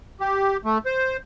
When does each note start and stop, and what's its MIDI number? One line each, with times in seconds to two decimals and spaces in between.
0.20 0.57 67
0.65 0.78 57
0.86 1.17 72